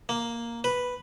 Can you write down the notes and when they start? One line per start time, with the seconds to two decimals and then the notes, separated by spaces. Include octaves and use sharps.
0.09 A#3
0.64 B4